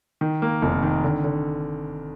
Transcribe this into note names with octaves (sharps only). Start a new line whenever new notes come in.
D#3
A#3
F1
D#3
D3
D3